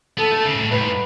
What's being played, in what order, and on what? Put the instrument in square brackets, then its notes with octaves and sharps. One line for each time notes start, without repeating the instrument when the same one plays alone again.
[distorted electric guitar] B3 [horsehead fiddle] A4
[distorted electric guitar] A3
C#3
G#2
A2
[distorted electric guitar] A2 [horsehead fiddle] B4
[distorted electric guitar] G#2